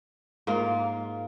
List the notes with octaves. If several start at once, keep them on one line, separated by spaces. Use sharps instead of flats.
G#2 A#3 F4